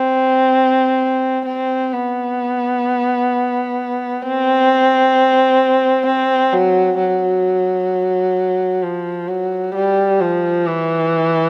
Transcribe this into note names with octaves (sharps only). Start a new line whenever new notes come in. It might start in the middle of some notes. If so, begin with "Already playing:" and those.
Already playing: C4
C4
B3
C4
C4
F#3
F#3
F3
F#3
G3
F3
E3